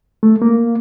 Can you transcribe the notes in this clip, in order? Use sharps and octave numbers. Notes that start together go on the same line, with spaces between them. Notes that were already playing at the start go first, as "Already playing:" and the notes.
A3
A#3